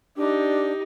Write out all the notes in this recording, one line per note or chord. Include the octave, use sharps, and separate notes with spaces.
D4 D#4 G4